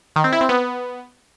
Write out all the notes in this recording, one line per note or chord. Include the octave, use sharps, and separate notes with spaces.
D#3
C4
E4
C4
B3